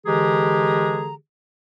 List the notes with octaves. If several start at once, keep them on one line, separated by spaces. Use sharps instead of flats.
D3 E3 G#3 G4 G#4 A#5